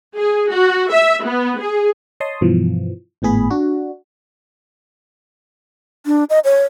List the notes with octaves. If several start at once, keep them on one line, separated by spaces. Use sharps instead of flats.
G#4
F#4
E5
B3
G#4
C#5 D#5 A5 C6 D#6
G2 B2 E3 F3
G#1 A2 B3 G#4 B5
D4 F#4
D4
D#5
C#5